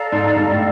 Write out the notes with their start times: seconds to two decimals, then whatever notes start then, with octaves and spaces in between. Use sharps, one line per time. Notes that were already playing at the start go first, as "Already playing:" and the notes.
Already playing: A4 D5 F5 A#5
0.12 G#2
0.36 G2
0.51 A2